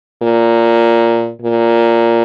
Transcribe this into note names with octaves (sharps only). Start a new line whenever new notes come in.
A#2
A#2